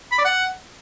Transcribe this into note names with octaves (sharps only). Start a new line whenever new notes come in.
B5
D5
F#5